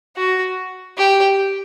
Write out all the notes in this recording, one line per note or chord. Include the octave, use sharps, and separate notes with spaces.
F#4
G4